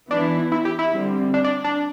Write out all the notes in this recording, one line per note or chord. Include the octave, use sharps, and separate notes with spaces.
E3 B3 D4 E4
E4
G4
E4
D3 G3 C4
D4
D4
D4